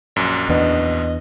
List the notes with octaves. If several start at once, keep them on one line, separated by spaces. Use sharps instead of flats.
A#1 F#2
E2 B3 D4 D#5